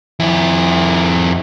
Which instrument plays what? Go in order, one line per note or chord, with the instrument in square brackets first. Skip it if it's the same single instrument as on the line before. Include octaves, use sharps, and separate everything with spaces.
[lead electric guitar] F2 E4